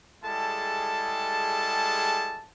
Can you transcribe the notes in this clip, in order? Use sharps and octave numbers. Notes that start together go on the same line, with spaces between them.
G3 G#3 E4 G#4 A4 A5